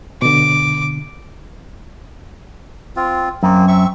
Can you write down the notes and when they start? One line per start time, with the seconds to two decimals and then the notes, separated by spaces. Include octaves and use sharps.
0.22 B2 D3 D6
2.96 C4 F4
3.43 F#2 A#3 C4
3.68 C4 E5 C#6